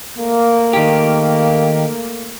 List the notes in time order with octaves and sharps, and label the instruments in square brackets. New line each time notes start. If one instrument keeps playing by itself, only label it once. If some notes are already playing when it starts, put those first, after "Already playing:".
[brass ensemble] A3 A#3
[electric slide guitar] D#3 G4